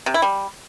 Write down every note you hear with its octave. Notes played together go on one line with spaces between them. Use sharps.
C3
E4
G3